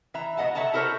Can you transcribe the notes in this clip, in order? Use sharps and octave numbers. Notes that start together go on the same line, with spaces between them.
E3 E5 A#5
B2 B3 D#5 F#5 A5
A4 C#5 E5 F#5 A5 A#5
E4 A4 A#4 C5 C#5 A#5